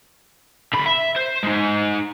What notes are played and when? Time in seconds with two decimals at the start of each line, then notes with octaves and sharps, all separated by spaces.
0.73 D3 B5
0.86 E5
1.16 C5
1.43 G#3 D#4